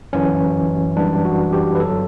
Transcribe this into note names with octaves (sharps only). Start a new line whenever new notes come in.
G1 F#2 E3 C#4
F#2 E3 G3 D4
F#4
G4
B4
G1 G2 F#3 A4